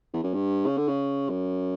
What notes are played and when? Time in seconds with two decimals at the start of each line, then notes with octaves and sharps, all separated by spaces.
0.14 E2
0.24 F#2
0.34 G2
0.66 C#3
0.77 D3
0.88 C#3
1.29 F#2